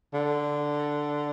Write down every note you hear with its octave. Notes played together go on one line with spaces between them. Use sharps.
D3